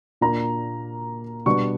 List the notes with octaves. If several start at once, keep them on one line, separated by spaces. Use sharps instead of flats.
A#2 A#3 D4 A#5
B2 G3 B3 D4 C#6